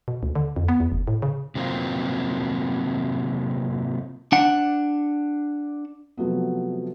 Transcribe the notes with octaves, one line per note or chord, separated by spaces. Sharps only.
B2
D2
D3
F2
B3
E2
F#1
A2
C#3
C3 F#3 A#3 C4 F4
D4 F#5
C3 F3 F#3 A3 B3